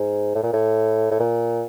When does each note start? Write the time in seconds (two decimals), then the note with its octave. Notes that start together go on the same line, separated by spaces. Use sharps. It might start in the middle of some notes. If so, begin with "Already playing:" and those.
Already playing: G#2
0.35 A2
0.43 A#2
0.53 A2
1.11 A2
1.20 A#2